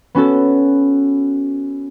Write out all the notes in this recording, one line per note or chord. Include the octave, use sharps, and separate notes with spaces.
B3 C#4 F#4 A4